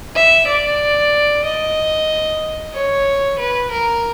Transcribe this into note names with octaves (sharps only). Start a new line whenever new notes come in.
E5
D5
D#5
C#5
B4
A#4